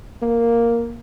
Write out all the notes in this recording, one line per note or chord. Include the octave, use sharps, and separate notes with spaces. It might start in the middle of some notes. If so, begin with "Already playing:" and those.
A#3